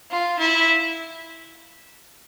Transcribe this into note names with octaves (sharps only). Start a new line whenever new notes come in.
F4
E4